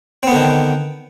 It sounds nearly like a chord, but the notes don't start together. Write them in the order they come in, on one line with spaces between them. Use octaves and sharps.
C4 B3 D3 D#3